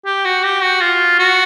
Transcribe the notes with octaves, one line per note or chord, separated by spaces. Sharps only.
G4
F#4
G4
F#4
F4
F#4